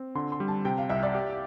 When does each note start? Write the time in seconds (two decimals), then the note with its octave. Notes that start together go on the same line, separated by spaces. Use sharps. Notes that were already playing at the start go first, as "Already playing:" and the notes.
Already playing: C4
0.15 D3 C6
0.32 C6
0.40 G3
0.48 A5
0.65 C3 G5
0.78 F5
0.89 C2 E5
1.03 D5
1.15 G4